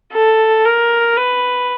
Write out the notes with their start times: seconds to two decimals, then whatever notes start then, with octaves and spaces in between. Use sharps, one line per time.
0.13 A4
0.65 A#4
1.17 B4